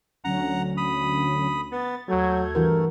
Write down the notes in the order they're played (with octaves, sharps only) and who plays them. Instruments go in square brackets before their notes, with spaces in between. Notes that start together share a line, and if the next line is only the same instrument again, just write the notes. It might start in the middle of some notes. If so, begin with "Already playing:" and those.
[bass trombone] D2 [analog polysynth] D3 F#3 C#4 [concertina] F#5 A#5
[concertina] B5 D#6
[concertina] B3 [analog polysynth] A6
[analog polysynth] D#2 G6 G#6 [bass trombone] F#3 [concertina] A3
[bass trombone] G2 [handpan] E3 F#4 A#4